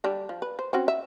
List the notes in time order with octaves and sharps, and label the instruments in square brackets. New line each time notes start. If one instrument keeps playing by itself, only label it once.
[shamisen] D3 G3 D4
F3
B4
C5
C4 C#4 F#4
E5